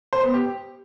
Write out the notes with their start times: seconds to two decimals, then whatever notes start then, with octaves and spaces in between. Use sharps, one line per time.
0.13 C5
0.23 B3
0.34 G4